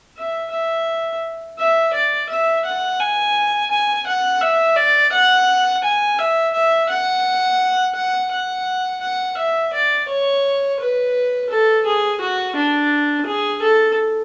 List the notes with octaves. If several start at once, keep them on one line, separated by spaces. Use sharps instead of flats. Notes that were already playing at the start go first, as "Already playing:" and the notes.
E5
E5
E5
D5
E5
F#5
G#5
G#5
F#5
E5
D5
F#5
G#5
E5
E5
F#5
F#5
F#5
F#5
E5
D5
C#5
B4
A4
G#4
F#4
D4
G#4
A4